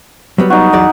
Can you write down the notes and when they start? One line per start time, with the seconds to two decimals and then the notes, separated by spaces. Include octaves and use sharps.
0.38 F#3 G3 B3
0.50 D#4 F#4
0.73 E2 F#3 D5